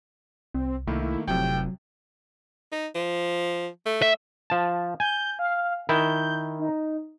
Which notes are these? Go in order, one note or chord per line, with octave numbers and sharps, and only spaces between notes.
C2 C4
C2 D#3 A3 A#3 E4
F1 A2 C3 F#3 G5
D#4
F3
A3
E5
F3 A5
G#5 G6
F5
D#3 E4 G6
D#4